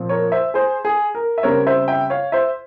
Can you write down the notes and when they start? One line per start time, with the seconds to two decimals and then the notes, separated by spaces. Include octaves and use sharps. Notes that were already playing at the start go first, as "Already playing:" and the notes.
Already playing: A#2 F3 C4
0.09 A#4 C#5
0.32 C5 E5
0.54 G#4 C5
0.85 G#4
1.15 A#4
1.38 E5
1.43 C#3 G3 C4 A#4 C#5
1.67 C5 E5
1.88 E5 G5
2.10 C#5 F5
2.32 C5 E5